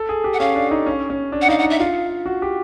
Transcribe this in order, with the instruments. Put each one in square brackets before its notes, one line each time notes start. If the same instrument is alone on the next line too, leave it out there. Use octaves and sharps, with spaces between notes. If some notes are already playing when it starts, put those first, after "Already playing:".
Already playing: [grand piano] A4
G#4
G4
[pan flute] F#5
[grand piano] C#4 [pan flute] F5
[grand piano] D4
D#4
C#4
C#4
D4
[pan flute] F#5
[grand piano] D#4 [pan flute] F5
[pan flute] F#5
[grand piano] D#4
[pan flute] E5
[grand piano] F4 [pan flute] F5
[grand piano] F#4
G4